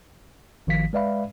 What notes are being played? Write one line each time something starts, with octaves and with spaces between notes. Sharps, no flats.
G#1 D#3 F3 F5 B6
G#3 B4 D5 E5 F5 B5